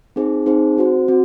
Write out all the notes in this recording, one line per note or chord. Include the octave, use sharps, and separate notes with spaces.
C4 D#4 G#4 C5
C4 D#4 G#4 C5
C4 F#4 C5
C4 F#4